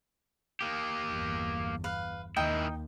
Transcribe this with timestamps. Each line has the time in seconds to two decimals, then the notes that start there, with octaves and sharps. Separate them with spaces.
0.61 A#3 G4
1.06 G1 E2
1.84 B4 F5
2.36 D#2 D#3 D#4 E4 D#5 G5